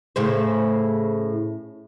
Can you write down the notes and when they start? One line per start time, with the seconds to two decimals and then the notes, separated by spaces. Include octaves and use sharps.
0.16 A2 C#3 C5